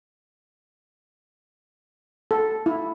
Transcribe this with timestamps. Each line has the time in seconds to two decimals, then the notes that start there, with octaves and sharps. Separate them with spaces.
2.31 A4
2.66 E4